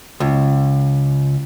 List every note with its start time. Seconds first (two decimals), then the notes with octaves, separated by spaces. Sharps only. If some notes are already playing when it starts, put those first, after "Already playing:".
0.20 C#2